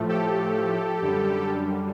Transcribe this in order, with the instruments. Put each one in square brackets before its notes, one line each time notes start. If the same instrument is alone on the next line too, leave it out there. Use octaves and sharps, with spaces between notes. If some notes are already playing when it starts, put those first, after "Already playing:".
Already playing: [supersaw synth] A2 F3 A3
G4 A4
F#2 D3 G3